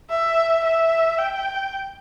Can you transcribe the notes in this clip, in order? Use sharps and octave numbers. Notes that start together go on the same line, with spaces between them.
E5
E5
G5